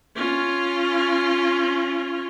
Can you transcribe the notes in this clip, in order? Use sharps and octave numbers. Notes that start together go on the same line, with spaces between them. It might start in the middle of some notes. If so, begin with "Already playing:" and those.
C#4 F4